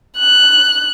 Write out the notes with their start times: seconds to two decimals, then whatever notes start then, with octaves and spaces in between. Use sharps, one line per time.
0.18 F#6